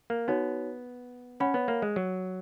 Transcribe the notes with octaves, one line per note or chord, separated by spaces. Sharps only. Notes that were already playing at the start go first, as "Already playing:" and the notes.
A#3
B3 D#4 F#4 C#5
C#4 C#5 F#5 B5
B3
A#3
G#3
F#3